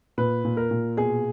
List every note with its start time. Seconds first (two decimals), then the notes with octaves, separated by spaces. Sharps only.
0.18 A#2 B4
0.45 A#2
0.57 A#4
0.71 A#2
0.97 B2 G#4